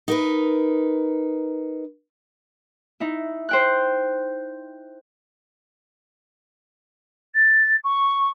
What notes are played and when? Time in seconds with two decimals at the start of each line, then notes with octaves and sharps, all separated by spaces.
0.08 D#4 A#4 B4
3.00 D#4 E4
3.49 C5 G5 F#6
7.34 A6
7.84 C#6